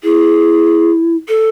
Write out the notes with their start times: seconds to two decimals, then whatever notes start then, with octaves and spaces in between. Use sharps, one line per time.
0.04 E4 G#4
1.28 A4